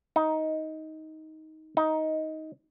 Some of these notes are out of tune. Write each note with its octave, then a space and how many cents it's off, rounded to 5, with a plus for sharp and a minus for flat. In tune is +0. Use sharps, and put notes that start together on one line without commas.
D#4 +15
D#4 +15